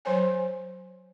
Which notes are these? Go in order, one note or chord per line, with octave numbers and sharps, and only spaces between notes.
F#3 C5 C#5 G#5